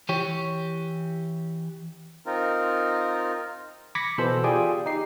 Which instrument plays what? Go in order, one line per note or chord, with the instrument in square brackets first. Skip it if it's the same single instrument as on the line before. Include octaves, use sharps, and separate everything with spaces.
[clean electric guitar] E3 G4 C#5
[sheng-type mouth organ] C4 D#4 F4 A#4
[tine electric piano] B5 D6 G#6 A#6 B6 C#7
B2 E3 A4 C5 B5 E6
F4 G4 G#4 D5 G5 G#5
D#4 G4 C7